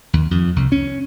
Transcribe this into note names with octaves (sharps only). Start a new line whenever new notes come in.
D#2
F2
C2
C#4